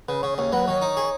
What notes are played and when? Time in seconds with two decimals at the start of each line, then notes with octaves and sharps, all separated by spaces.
0.08 C#3 B4
0.23 C#3 C#5
0.38 D#2 C#5
0.52 F#3 B4
0.67 D#3 C#5
0.82 D#4
0.97 G#4